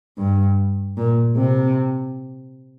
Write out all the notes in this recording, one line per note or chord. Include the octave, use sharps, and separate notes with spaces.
G2
A#2
C3